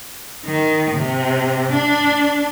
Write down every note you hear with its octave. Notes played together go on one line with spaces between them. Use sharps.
D#3
C3
D4